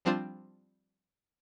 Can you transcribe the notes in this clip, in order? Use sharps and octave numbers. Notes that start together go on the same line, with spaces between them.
F3 G3 C4 D4 F4 C5